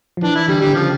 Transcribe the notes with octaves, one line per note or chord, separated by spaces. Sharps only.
F3
E3 D4
E4
D3 G3
D3 G3
C#3 F3